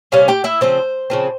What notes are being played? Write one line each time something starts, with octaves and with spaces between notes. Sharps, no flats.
C3 G3 C#4 F5
G4 G5
E4 E5
C#3 F3 C4 C5
C#3 F3 C4